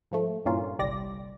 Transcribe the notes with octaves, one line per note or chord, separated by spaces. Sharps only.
G#2 F3 A3
G2 A#2 E3 A#3 C#4 F4
G1 C2 G3 D5 A#6